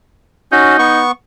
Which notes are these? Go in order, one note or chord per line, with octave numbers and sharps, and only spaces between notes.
C#4 D#4 F#4
B3 C#6